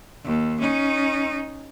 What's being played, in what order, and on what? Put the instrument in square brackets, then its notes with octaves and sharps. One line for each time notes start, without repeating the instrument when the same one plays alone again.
[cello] D#2
C#4 D#4